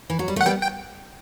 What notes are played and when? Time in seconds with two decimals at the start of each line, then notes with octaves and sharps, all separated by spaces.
0.10 E3
0.19 F#3
0.28 G3
0.36 A3
0.41 F#5
0.46 G3 B3 G5
0.62 G5